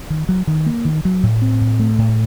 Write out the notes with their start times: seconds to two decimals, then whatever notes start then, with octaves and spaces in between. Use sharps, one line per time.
0.10 D#3
0.29 F#3
0.47 D#3
0.66 A#3
0.85 D#3
1.05 F#3
1.23 A2
1.42 C4
1.61 A2
1.80 A3
1.98 A2